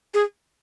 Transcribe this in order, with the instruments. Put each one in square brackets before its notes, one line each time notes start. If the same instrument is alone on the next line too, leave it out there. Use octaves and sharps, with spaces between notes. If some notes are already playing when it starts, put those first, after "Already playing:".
[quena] G#4